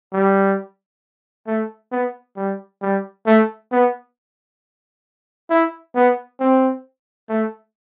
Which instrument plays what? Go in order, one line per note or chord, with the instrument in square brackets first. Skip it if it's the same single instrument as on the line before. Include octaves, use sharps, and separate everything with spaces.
[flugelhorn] G3
A3
B3
G3
G3
A3
B3
E4
B3
C4
A3